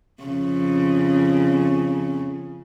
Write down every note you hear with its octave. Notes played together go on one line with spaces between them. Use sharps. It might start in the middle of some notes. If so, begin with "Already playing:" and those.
F2 C#3